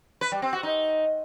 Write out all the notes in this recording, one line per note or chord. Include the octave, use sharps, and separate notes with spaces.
B4
G3
C4
F#4
D#4